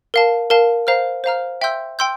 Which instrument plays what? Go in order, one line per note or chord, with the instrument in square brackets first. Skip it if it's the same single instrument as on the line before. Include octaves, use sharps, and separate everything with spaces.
[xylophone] A#4 F5 A5
A#4 F5 A5
C5 F5 A#5 F6
C5 F5 A#5 F6
E5 G5 C6 E6 G6
G5 C6 E6 G6